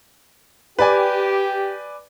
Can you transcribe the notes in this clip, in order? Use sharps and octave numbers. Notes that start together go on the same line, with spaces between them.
G4 B4 D5 G#5